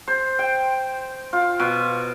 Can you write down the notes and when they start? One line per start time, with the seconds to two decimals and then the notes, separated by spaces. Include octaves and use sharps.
0.07 C5
0.39 G5
1.33 F4
1.60 B2